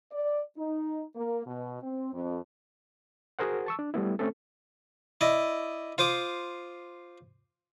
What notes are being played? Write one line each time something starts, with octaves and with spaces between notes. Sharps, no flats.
D5
D#4
A#3
B2
C4
F2
F#4 G#4 A#4 C5 F#5
A5 C#6 E6
D4
G3 A3 B3 E4
A3 C4 C#4 A4
E4 D5 D#5
F4 C5 D6 D#6